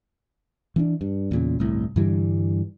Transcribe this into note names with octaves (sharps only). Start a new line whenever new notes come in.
E3 C#4 D4
G2
E2 A#2 C#3
G1 C2 A2
G2 D3 E3 G3